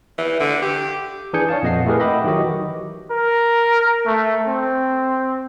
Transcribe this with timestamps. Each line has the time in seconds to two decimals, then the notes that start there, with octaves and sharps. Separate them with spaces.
0.18 E3
0.40 D3
0.62 G4
1.33 E3 D4 G#4 G#5 G6 C#7
1.49 C#5 D5 F5 A5
1.63 F2 A#2 D#5 F#5 C7
1.86 A3 E4 G4 G#4 A#4 B4
2.00 D#5 E5 F#5 G5 B5 D6
2.24 D#3 E3 F#3 F#4 G4 D#5
3.11 A#4
4.06 A3
4.48 C4